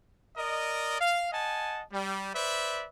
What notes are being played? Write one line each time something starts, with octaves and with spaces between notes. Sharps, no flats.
A#4 D5 D#5
F5
D#5 F#5 G#5 A5
G3
B4 C5 D5 E5